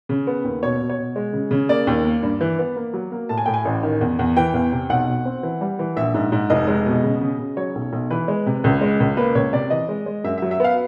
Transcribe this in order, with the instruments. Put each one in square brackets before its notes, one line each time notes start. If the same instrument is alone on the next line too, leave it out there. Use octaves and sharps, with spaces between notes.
[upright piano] C#3
B3
D#2
B2 C#5
B2
C#5
B2
G#3
C#3
C#3
A#3 D5
D#2
A#3
G2
E3
B3
A#3
F#3
A#3
A2 A5
G#5
A2 G5
G#5
A1
D#3
E2
E2
E3 G5
E2
C3
B1 F#5
B2
C4
E3
G3
E3
A#1 E5
G#2
G#2
F1 D#5
G#3
B2
C#3
C#3
C#3
F#3 C#5
B1
B1
E3 B4
G#3
C3
C#2
G#3
C#2
A#3 B4
C#2 C#5
C3 D5
E3 D#5
G#3
G#3
F#2 E5
E5
F#3
E5
B3 F5